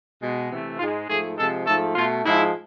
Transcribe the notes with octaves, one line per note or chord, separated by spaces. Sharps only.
B2 G#3
C3 E3 A3
G#2 G#3 F4
G#2 F3 A3 G#4
C3 F3 G#3 A4
G#2 F3 A3 A4
B2 A3 F4
G#2 F3 G#3 E4